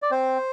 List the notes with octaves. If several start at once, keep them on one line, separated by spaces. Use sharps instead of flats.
D5
C4 C5